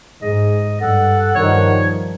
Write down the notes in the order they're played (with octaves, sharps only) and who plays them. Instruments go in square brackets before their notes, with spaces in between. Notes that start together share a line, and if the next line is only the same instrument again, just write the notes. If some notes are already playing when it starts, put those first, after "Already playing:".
[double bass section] G#2 [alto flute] G#4 [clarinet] D#5
[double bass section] G2 [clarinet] A4 [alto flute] F#5
[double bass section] G2 D#3 F3 [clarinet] C#5